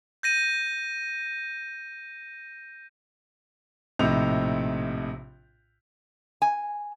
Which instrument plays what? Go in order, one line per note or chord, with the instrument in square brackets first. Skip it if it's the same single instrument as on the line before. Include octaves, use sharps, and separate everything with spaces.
[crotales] G6 A#6 D#7
[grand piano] A#1 A2 C3 D#4 G6 F7
[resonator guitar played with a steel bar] G#5